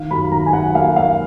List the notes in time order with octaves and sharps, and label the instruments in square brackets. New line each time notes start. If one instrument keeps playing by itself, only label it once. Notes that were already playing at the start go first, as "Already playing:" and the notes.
Already playing: [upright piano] D#3 F5
F#2 B5
D#3 A#5
G#5
F#2 F#5
A#3 F5
A#3 F5